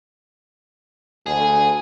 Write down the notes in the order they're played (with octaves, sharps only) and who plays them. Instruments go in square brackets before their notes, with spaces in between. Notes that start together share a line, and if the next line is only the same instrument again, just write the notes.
[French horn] D2 [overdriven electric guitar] G#4